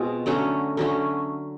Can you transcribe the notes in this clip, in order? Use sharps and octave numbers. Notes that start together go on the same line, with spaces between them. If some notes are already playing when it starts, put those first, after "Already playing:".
Already playing: B2 G#3 C4 F4
D3 F#3 A3 C#4
D3 F#3 A3 C#4